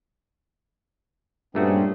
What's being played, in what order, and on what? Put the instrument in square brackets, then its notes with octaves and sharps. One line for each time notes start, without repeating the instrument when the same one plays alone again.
[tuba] G2 [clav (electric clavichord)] A#2 A3 F#4 [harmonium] C4 C#4 G#4